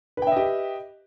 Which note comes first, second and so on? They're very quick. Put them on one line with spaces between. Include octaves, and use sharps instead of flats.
B4 G5 E5 D#5 G4